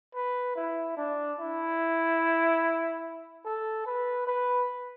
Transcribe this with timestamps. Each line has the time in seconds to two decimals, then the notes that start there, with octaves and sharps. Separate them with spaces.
0.15 B4
0.56 E4
0.97 D4
1.39 E4
3.46 A4
3.86 B4
4.27 B4